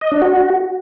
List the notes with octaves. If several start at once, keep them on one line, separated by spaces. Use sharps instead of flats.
D#5
D4
F#4